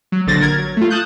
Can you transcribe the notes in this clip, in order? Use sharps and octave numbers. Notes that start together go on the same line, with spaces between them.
F#3
A#1 D3 F#3 C5 A6 A#6
A#4 G#6
F#3
A3 F4
A5 D#6 F#6 G6